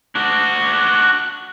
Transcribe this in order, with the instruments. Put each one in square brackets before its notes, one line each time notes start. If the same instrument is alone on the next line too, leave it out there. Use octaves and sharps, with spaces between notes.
[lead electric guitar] D4 F#4